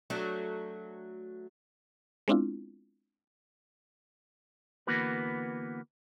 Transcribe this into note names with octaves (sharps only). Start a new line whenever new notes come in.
F#3 A3 D4
G#3 B3 C4 D4 E4 F4
D3 E3 A#3 B3 F#4 B4